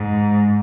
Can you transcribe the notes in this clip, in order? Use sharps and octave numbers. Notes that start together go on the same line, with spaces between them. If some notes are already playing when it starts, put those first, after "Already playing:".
Already playing: G#2